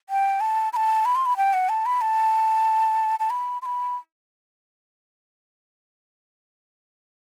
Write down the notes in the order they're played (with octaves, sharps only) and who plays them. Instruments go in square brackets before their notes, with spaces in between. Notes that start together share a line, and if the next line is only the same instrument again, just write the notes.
[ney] G5
A5
B5
A5
B5
C6
B5
G5
F#5
A5
B5
A5
A5
B5
C6
B5